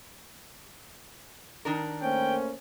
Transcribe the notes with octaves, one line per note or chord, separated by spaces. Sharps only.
D#3 D4 A#4
A3 A#3 C#4 C5 G5